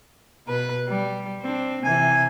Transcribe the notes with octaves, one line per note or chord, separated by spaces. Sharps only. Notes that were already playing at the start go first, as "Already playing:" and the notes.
B2 B4
G3
C4 D4
C3 E3 G#5